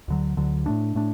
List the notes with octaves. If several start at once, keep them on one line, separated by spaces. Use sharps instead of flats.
D2 D3 F#3
D2 D3 F#3
A2 A3 D4
A2 A3 D4